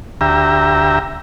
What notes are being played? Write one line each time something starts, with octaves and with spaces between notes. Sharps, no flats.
D2 G4 E5 A#5